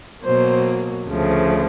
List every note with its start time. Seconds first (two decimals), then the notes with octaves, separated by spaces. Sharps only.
0.23 B2 F#3 A#3 C5
1.07 D2 C#3 F3 A3